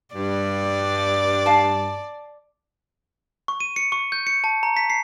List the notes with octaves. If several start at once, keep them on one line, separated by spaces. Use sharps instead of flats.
G2 D5
F5 A5
C#6
D#7
C#7
C#6
G6
C#7
A5
A#5
B6
C7